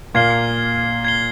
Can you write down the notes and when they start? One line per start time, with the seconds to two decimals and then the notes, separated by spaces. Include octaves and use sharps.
0.15 A#2 A#3 G#6 C7 G7
1.05 G#6 C7 G7